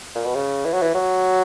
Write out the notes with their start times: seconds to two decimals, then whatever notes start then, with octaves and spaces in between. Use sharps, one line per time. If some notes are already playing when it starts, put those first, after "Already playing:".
0.15 A#2
0.25 B2
0.35 C#3
0.65 E3
0.73 F#3
0.82 E3
0.95 F#3